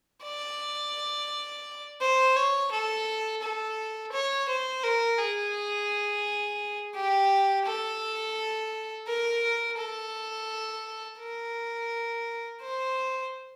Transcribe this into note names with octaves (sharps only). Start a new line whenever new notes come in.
D5
C5
C#5
A4
A4
C#5
C5
A#4
G#4
G4
A4
A#4
A4
A#4
C5